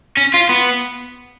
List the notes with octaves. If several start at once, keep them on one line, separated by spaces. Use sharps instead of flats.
C#4
F4
B3